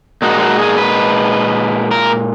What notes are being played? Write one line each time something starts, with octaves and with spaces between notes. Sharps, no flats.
A#2 G#3 D#4 F#4
F#4
G#4
B4
A#4